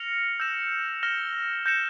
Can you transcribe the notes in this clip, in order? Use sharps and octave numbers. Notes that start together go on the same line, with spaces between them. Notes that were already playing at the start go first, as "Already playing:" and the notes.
Already playing: F6 A#6 C#7 F7
E6 G6 A#6 E7
F6 A#6 E7 G7
G6 A#6 C#7 E7